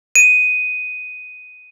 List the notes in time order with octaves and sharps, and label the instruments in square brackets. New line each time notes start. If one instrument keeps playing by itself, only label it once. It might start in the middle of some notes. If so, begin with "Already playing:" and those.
[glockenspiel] D#7